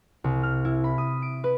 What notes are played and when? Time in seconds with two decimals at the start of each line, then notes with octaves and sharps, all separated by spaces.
0.24 C2
0.43 F6
0.65 E4
0.84 B5
0.98 D#6
1.22 D7
1.44 B4